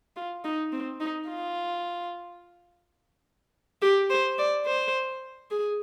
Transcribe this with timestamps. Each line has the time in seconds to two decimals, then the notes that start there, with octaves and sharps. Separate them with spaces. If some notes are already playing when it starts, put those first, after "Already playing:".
0.16 F4
0.44 D#4
0.73 C4
1.00 D#4
1.29 F4
3.82 G4
4.10 C5
4.38 D5
4.67 C5
5.51 G#4